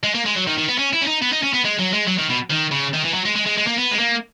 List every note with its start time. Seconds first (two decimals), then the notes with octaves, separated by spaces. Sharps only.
0.03 G#3
0.15 A#3
0.26 G#3
0.36 F#3
0.47 D#3
0.58 D#3
0.69 B3
0.78 C#4
0.93 E4
1.01 C#4
1.07 D#4
1.22 B3
1.32 D#4
1.43 C#4
1.53 B3
1.64 G#3
1.79 F#3
1.93 G#3
2.07 F#3
2.18 D#3
2.29 B2
2.50 D#3
2.71 C#3
2.94 D#3
3.04 E3
3.14 F#3
3.25 G#3
3.36 G#3
3.46 G#3
3.58 G#3
3.67 A#3
3.78 B3
3.92 G#3
3.99 A#3